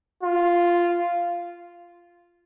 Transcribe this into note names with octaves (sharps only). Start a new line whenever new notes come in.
F4